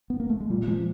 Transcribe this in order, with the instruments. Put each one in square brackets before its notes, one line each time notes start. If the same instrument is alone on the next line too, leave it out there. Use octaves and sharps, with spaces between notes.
[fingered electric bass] B3
A#3
A3
G#3
[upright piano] A#2 [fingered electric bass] G3
[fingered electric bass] A3
[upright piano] F3 [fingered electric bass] G#3